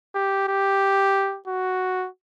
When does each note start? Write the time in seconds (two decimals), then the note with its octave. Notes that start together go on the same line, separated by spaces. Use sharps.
0.15 G4
0.48 G4
1.48 F#4